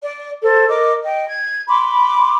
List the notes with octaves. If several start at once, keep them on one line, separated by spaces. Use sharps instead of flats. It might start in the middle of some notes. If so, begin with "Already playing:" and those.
D5
A4 C5
A#4 D#5 D6
D#5 G5
G#6
B5 C6 D6